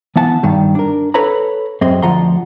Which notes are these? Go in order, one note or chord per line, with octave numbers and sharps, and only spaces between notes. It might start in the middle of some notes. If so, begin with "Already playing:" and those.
E3 B3 F#5 A5
G2 D#3 G3
D4 A#4
A4 B4 C#5 A#5 B5
F#2 C4 G#4 D#5 C6
D2 F3 F#5 A#5 C6